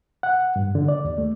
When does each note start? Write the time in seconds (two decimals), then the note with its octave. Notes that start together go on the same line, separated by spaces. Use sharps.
0.23 F#5
0.56 G2
0.75 D3
0.88 D5
1.05 D#2
1.18 A3